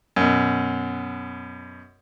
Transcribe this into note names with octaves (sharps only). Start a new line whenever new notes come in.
F#2 B2